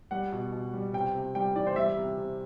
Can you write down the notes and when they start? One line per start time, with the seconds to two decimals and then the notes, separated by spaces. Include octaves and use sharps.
0.11 G3 F#5
0.32 B2
0.52 B2
0.74 G3
0.93 C3 G5
1.15 C3
1.35 G3 G5
1.56 E3 D5
1.67 C5
1.76 G3 E5
1.97 C3
2.18 C3